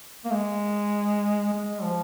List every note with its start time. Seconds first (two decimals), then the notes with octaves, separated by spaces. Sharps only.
0.25 A#3
0.32 G#3
1.53 G#3
1.83 F3